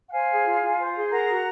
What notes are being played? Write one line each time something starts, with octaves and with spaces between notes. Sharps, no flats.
F#5
C5 F5 G#5
G#4
F4
F4
C5
G#4
A#4 F#5 A#5
F#4